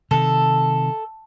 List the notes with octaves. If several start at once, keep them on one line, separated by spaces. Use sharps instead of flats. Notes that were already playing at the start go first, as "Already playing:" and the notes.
C3 D#3 A4